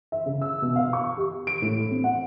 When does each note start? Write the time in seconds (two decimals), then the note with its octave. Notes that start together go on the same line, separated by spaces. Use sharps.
0.12 E5
0.26 C#3
0.42 E6
0.62 B2
0.76 F5
0.93 C#6
1.17 G4
1.47 D7
1.62 A2
1.91 C4
2.04 F#5